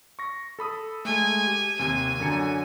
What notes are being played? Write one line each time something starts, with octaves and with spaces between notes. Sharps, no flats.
C#6 A#6
A4 B5 D#6
G#3 A3 G#5
G4
D#2 C3 G#5
F#2 D3 C#7